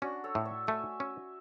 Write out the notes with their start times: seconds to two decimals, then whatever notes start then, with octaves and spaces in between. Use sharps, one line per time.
0.02 C#4 D4 F#4
0.24 A4 C#5
0.35 A2
0.45 C#5 E5
0.67 A3 E5 G#5
1.00 C#4